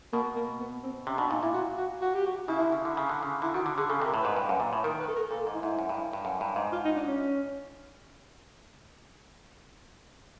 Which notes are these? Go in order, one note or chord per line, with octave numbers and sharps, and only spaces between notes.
B2 A#3
A#3
B3
C4
C3 C#4
B2 D4
A#2 D#4
A#2 E4
F#4
F#4
F#4
G4
F#4
C#3 E4
D3
C#3
D3
C#3
D3
C#3
D3 E4
D#3 F#4
D3
D3 G#4
C#3 A4
C3 A#4
A2
G#2 B4
G2
F#2
A#2
A2
D#3 A#4
B4
A4
A#4
A#2 A4
G#2
E4
G#2
F#2
G2
G2
F#2
G2
G#2
F4
D#4
D4
C#4